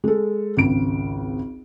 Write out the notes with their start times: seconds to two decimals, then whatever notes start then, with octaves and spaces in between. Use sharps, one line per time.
0.04 G#3 A4
0.57 G#1 C#2 D7